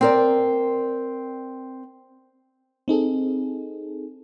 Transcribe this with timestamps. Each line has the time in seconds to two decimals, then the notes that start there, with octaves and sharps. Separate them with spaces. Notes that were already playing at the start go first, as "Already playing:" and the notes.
0.01 C4 A#4 D5
2.88 C4 D#4 G#4 A4